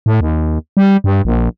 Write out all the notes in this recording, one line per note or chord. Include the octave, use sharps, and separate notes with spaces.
A2
D#2
G3
G2
A#1